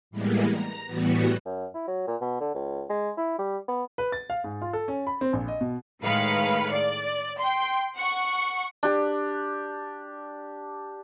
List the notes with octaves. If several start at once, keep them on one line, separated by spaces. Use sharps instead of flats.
A2 E3 G3 G#3 A#3 B3
A#5
A2 E3 G3 B3 F#4
F#2
E4
F#3
A#2
B2
D3
C#2
G#3
E4
G3
B3
B4
A6
F5
G#2
F4
A4
C#4
B5
C4
A#1
D#5
B2
A2 D#3 G#3 B4 F5 C#7
D5
G5 C6
F#5 C#6 C#7
D4 G4